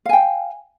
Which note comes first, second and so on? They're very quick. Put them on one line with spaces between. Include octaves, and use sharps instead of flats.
F5 G#5 G5